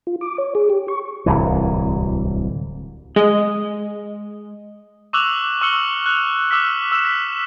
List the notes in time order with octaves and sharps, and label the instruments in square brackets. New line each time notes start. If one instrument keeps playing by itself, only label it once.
[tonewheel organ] F4
D6
C#5
G#4
G4
C#6
[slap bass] D1 C2 E3
[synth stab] G#3 [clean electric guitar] D#5
[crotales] C#6 D6 E6 F#6 F7 F#7
C#6 E6 F6 C#7 F#7 G7
F#6 F7
D6 E6 F6 B6
E6 E7
B6